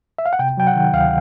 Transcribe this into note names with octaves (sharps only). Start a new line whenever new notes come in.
E5
F5
F#5
C3 G5
F#3 G5
F#5
D#3
D2 F5